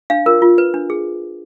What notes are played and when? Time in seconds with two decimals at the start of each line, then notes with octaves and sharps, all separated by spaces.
0.10 D4 F5
0.26 F4 A#4
0.42 F4
0.58 B4
0.74 D4
0.90 G#4